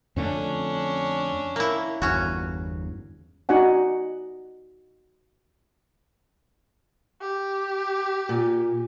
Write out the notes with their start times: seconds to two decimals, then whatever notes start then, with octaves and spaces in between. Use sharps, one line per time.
0.16 F2 D3 A3 C#4 D4
1.56 A#3 E4
2.02 G1 E2 C#4 F#4
3.49 D#4 F#4 D5 F#5 G#5
7.21 G4
8.29 A#2